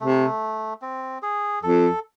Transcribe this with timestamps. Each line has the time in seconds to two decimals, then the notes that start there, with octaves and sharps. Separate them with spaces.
0.01 C3 A3
0.82 C4
1.22 G#4
1.63 F2 A4